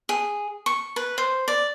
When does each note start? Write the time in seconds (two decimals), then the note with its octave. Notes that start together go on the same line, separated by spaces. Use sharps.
0.09 G#4
0.66 C#6
0.96 B4
1.18 C5
1.48 D5